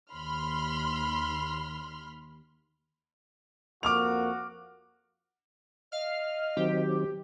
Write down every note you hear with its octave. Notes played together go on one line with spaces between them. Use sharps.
D#2 B5 C6 F6
F2 A#3 F#4 D6 F6 F7
D#5 F5 F6
D#3 F#3 C4 G4